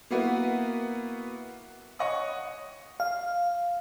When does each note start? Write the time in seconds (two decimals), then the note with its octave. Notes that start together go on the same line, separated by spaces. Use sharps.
0.11 A#3 B3 E4 F#4 B4
1.99 C#5 D#5 F#5 C#6 D#6
3.00 F5